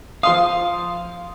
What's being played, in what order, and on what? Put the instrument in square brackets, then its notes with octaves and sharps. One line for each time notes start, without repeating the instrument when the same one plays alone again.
[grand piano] F3 C6 D#6 [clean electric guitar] F5